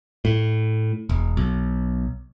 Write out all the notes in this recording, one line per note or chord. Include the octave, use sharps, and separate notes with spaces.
A2
E1
B1